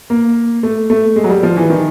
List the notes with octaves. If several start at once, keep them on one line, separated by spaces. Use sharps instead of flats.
A#3
A3
A3
G#3
F#3
G3
F3
E3
D#3